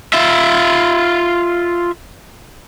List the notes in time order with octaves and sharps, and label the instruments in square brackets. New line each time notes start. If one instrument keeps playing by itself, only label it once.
[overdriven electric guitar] F4 E5